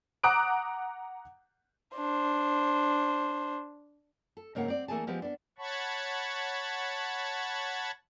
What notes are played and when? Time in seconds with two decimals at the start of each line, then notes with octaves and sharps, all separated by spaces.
0.23 F#5 A#5 D6 D#6 F#6 D7
1.97 D4 C5
4.37 A4
4.55 G#2 C#3 A#3 C#5 F#5
4.68 C4 D5
4.88 E3 A3 A#3 G#4 G#5 A5
5.07 F3 G#3 B3 G4
5.22 B3 D4
5.58 C#5 F#5 A5 B5 C#6